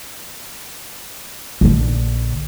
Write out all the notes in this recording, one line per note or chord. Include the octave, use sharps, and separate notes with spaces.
A#1 D3